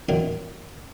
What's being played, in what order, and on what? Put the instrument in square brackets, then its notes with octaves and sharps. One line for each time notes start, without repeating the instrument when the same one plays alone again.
[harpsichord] A#2 D#3 E3 F#3